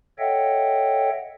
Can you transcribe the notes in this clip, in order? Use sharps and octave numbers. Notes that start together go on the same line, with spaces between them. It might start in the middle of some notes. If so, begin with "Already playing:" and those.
A4 C#5 D#5 E5 F#5 G5